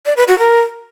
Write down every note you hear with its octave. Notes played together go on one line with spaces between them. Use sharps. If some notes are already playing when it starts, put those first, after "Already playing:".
D5
B4
F#4
A#4